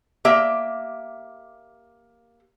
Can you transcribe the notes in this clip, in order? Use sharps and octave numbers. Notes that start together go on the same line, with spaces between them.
A#3 G4 E5